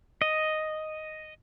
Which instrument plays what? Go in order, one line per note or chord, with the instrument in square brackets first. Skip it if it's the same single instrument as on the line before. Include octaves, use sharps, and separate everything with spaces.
[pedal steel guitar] D#5